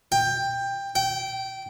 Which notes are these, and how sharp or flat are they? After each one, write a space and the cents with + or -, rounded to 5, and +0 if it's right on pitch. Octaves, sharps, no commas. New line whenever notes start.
G5 +15
G5 -20